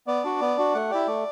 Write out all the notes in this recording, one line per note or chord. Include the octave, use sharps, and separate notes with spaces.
B3 D5
D4 F#4
B3
D4 F#4
A3 F#5
E4 G4 D5
A3